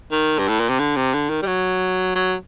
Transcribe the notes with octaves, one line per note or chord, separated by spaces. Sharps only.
D#3
G2
A2
A#2
C3
D3
C3
D3
D#3
G3
F#3
F#3